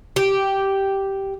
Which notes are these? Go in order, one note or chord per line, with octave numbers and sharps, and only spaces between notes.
G4